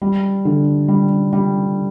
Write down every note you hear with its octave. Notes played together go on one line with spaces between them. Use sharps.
G3
D3
G3
G3